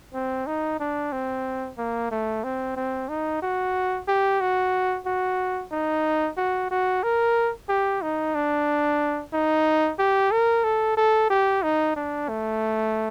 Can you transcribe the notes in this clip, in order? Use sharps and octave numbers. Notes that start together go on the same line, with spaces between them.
C4
D#4
D4
C4
A#3
A3
C4
C4
D#4
F#4
G4
F#4
F#4
D#4
F#4
F#4
A#4
G4
D#4
D4
D#4
G4
A#4
A4
A4
G4
D#4
D4
A3